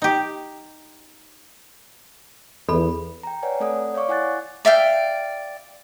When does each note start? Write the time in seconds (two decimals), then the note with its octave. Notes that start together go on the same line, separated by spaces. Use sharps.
0.02 D#4 G4
2.69 E2 A4 B5
3.23 G5 A#5
3.43 B4 C#5 D5 F#5 G#5
3.60 A3 C4 A4 D5 F#5 D#6
3.94 C#5 D5 F5 C#6 D6
4.09 E4 F#5 G#5 D6 F#6 A6
4.65 D5 E5 F5 G5